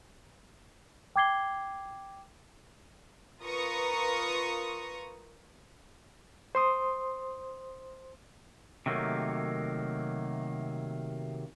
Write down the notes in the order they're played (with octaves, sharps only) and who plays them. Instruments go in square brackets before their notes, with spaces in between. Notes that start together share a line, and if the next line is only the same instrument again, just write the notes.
[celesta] G5 D6 G#6 C7 G7
[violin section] F4 A#4 B4 A#5 C#6 D#6
[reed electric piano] C5 C6 D#6
[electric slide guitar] C3 D#3 F#3 A3 A#3